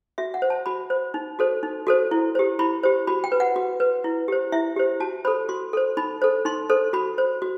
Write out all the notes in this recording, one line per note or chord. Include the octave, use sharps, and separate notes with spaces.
F#4 E5
F#5
C5
A5
F#4 B5
C5
D#4
F#4 A4 C5
D#4
F#4 A4 C5
E4
G4 C5
E4 B5
G4 C5
F#4 B5
G5
B4
F#5
F#4
B4
E4
G4 C5
E4 E5
G4 C5
F#4 A5
A4 C5 B5
F#4 C6
A4 C5
D#4 B5
A4 C5
D#4 C6
A4 C5
F#4 B5
C5
F#4